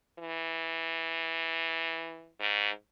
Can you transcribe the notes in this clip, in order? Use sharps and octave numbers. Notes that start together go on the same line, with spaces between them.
E3
G#2